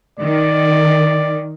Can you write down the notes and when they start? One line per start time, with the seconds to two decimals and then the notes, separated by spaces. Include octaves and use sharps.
0.19 D#3 D5